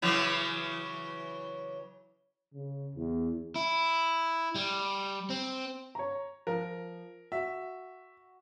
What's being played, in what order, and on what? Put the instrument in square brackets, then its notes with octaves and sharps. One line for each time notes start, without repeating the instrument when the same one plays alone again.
[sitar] C#3 E3 F#3
[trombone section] C#3
E2
[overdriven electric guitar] E4
G3
C4
[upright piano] C#5 A#5
[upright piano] F3 [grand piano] A#4
[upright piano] F#4 [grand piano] E5